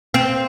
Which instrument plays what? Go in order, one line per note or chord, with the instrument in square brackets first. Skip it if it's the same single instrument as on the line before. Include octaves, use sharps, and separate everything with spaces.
[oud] C4